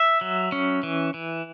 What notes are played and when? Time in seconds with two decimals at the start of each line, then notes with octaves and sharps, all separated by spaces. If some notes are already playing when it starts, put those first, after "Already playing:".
Already playing: E5
0.21 F#3
0.52 C#4
0.83 E3
1.14 E3